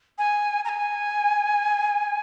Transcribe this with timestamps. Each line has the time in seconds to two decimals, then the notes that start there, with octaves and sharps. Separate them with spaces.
0.18 G#5
0.65 A#5
0.69 G#5